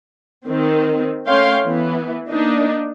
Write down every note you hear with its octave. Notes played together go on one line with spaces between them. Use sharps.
D#3 C4
A3 C#4 C#5 F5 G5 C6
E3 B3
A#3 D4 D#4